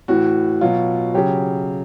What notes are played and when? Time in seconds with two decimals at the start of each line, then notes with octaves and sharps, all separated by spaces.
0.08 A2 E3 F#4
0.61 B2 F#3 F4
1.14 C#3 F#3 G4